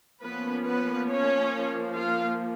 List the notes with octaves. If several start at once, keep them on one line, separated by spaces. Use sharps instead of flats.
F3 A#3 B3 C#4 B4
B3 B4
C#4 C#5
F4 F5